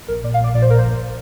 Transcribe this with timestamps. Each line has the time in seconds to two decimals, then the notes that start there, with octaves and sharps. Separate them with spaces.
0.08 A#1 A#4
0.23 A#2 D5
0.34 F5
0.39 A#1 D5
0.54 A#2 D5
0.62 C5
0.69 A#1 A#4
0.78 C5
0.85 G1